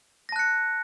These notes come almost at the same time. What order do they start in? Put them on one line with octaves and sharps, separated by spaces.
A#6 A5 F#6 C#7